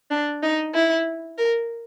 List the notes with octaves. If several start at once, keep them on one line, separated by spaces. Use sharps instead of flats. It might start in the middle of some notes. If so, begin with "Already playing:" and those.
D4
D#4
E4
A#4